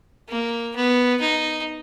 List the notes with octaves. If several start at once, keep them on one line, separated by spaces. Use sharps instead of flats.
A#3
B3
D#4